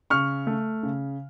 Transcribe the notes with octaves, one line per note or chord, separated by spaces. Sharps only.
C#3 C#6 F6
A3
C#3